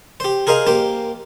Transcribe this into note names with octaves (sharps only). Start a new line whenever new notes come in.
G4 C5
G#4 A#4 C5 D#5 F5
A#3 G4 C5